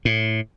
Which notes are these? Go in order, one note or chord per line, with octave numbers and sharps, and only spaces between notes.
A2